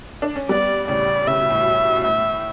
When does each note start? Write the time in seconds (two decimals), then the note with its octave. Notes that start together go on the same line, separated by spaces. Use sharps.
0.22 D4
0.36 C#4
0.49 G3 B3 D5
0.88 A2 C#3 D5
1.27 C#3 E5
1.39 B2
1.50 A2
1.62 B2
1.96 B2
2.04 A2 E5